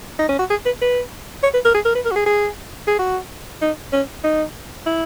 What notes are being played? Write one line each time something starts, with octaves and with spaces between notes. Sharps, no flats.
D#4
C#4
F#4
G#4
B4
B4
C#5
B4
A#4
G#4
A#4
B4
A#4
F#4
G#4
G#4
G#4
F#4
D#4
C#4
D#4
E4